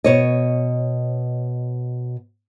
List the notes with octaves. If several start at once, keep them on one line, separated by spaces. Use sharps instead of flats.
B2 C#5 D#5